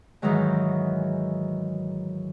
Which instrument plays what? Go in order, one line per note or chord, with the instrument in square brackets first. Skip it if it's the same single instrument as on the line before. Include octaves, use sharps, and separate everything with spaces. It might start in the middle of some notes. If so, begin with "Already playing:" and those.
[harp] G#2 D#3 E3 F#3 G#3